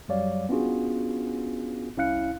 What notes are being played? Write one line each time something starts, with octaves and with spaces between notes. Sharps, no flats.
F#2 F#3 G3 C#5 D5 F5
B3 C#4 D4 F4 F#4 G#4
C2 C#4 E4 F5 F#6 C#7